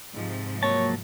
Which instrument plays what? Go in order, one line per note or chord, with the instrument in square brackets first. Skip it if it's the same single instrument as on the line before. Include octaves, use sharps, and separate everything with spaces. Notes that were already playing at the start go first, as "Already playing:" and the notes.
[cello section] G#2 C3 F3
[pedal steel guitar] F#3 A#3 A5 [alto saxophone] C#5